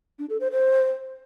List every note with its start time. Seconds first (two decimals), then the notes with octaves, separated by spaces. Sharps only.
0.19 D4
0.30 A4
0.40 C5
0.51 C5